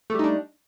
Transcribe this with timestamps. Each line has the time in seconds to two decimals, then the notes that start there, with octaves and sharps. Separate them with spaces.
0.10 A3
0.14 G3
0.19 D#4
0.24 D4